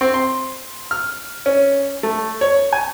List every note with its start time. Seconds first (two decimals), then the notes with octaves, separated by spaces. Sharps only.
0.01 C4
0.14 C6
0.91 F6
1.46 C#4
2.03 A3
2.41 C#5
2.73 G#5